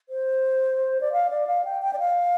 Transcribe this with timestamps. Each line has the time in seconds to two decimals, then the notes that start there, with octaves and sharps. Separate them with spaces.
0.09 C5
1.01 D5
1.13 F5
1.30 D5
1.47 F5
1.65 G5
1.82 G5
1.93 D5
1.99 F5